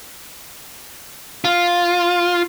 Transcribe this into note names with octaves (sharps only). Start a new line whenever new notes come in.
F4